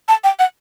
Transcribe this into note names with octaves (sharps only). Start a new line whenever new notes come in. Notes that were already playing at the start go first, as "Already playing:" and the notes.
A5
G5
F#5